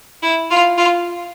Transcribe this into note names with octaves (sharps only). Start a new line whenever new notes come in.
E4
F4
F4